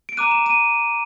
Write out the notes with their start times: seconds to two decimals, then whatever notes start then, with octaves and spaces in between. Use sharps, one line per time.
0.09 D7
0.17 A#5 D6 F#6 D#7
0.31 E7
0.46 D#7